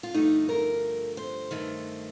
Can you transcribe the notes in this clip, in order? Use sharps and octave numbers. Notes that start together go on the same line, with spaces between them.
F4
G2 D3 F3 A3 D#4
A#4
C5
G2 D#3 A3